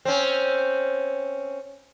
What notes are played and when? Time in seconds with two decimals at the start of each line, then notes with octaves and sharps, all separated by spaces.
0.05 C4 C#4